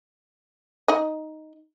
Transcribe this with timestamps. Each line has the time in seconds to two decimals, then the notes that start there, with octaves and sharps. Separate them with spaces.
0.88 D#4 D#5